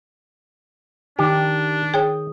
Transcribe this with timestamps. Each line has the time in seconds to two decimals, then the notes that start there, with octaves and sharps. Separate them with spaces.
1.19 D#3 D4 G4
1.94 G#4 C#5 G5 D#6